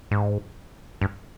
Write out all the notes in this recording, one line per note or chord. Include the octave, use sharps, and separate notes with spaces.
G#2
G2